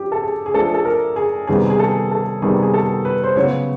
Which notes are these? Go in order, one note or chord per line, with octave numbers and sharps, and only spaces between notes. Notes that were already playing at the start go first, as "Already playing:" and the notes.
Already playing: F3 D4 G4
A4
G#4
G#4
F3 A3 D4 A4
A4
A#4
G#4
C3 D#3 G3 B3 G#4
G#4
A4
A4
C3 D#3 G3 B3 G#4
G#4
A4
B4
C5
C#3 F#3 B3 C#5